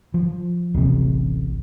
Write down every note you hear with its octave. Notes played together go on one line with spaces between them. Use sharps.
F3
D1 A1 C3